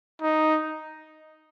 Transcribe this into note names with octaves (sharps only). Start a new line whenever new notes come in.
D#4